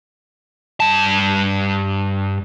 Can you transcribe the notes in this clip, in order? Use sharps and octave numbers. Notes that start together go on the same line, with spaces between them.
G2 A5